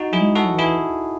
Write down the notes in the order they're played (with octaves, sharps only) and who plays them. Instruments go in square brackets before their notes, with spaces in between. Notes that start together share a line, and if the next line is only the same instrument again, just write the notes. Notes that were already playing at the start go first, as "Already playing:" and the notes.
Already playing: [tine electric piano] D#4 F#4
[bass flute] F#3 [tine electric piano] E4 G#4
[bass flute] G#3
[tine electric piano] F#4 A4
[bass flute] F#3
E3
[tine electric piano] E4 G#4